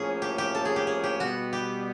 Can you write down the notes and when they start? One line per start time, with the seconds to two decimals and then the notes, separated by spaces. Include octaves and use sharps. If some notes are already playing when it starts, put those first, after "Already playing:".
Already playing: A2 F3 A#3 C#4 E4 G#4
0.22 G4
0.38 G4
0.55 A4
0.65 G#4
0.76 G4
0.87 G#4
1.04 G4
1.20 B2 G3 B3 F#4
1.53 G4